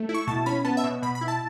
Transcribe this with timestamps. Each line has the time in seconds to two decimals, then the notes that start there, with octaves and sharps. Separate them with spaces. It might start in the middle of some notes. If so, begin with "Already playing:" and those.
Already playing: A3
0.09 E4
0.14 C#6
0.27 B2 A5
0.46 C#4 B5
0.65 B3 A5
0.77 E5
0.84 B2
1.02 B2 B5
1.15 B5
1.21 E4
1.28 A5